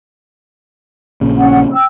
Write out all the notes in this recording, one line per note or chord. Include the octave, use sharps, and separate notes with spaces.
A#1 A#2 C#3
C#4 F#5
G5 E6